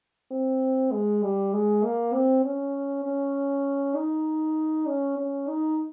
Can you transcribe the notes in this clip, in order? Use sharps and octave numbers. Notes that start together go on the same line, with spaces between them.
C4
G#3
G3
G#3
A#3
C4
C#4
C#4
D#4
C#4
C#4
D#4